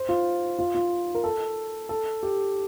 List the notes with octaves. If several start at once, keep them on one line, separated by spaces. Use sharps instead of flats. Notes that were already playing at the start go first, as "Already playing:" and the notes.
Already playing: C5
F4
F4
F4
A#4
A4
A4
G4